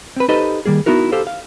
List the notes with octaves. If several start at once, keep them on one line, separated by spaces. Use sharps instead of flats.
C4 B4
D#4 G4 A4 B4 C5 D#5
D#3 G3 A#3 G#4
B3 D#4 E4 F#4 A#4
G4 A4 C5 F5
F5